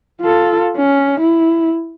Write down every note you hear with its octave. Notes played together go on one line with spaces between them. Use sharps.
F4 A4
C#4
E4